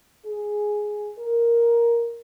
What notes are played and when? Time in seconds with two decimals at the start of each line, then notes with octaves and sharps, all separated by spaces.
0.25 G#4
1.18 A#4